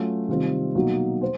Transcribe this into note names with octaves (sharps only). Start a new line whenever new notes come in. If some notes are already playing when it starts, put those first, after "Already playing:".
Already playing: F#3 A3 C#4 F4
C3 D#3 G3 C4 F4
B2 F#3 A#3 D#4 F#4
C5